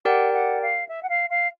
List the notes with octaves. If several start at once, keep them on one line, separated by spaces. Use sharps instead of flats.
G4 A#4 D5 F#5 G5
F#5
F5
E5
F#5
F5
F5